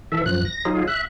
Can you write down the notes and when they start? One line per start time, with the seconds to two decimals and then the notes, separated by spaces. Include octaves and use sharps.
0.12 E3 A4 E5
0.26 F#2 F3 F#6
0.45 A#6
0.65 F#3 D#4 F4 G#4
0.88 E5 F#6